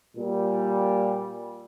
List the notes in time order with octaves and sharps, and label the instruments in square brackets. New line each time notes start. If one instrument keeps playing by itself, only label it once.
[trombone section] A#2 G3